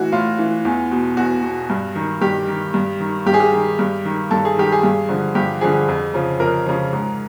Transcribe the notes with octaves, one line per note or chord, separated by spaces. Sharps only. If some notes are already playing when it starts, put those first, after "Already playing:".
Already playing: A2 E3 F#4
A2 F4
E3
E2
B2
E2 F#4
B2
G2
D#3
G2 G4
D#3
G2
D#3
G2 G4
G#4
G4
D#3
G2
D#3
G2 A4
G#4
D#3 G4
G#4
G2
D3 F3
G2 G4
D3 F3 G#4
F2
C#3 F3
F2 A#4
C#3 F3
G#2